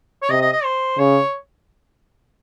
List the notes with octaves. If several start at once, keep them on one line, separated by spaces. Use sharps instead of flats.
C#5
C3 D#5
D#5
D#5
C5
C#3 C#5